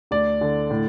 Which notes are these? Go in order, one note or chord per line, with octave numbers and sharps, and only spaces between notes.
D2 D5
D3
A2